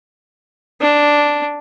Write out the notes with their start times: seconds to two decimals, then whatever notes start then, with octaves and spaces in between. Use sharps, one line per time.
0.81 D4